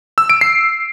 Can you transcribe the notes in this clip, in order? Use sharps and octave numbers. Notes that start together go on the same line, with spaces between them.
E6
D7
C7